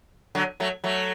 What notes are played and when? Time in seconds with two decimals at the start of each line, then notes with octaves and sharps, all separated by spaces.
0.35 D3 F#3
0.60 F#3 A3
0.84 F#3 A3